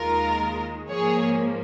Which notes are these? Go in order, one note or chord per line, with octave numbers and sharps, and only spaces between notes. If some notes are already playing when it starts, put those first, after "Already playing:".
Already playing: D#2 D#3 G#3 F4 A#4
G#2 F3 A#3 G#4 C#5